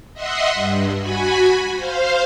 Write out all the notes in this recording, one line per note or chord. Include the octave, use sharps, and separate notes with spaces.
D#5 E5 F#5 C6
G2
F#4 G#5 B5
C5 F5